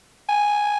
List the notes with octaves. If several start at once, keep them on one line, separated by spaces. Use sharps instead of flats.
G#5